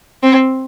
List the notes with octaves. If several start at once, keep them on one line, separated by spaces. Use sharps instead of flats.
C4